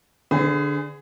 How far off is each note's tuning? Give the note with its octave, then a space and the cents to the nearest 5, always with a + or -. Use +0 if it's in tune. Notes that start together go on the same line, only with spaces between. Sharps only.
D3 +0 G#4 +0 B4 +45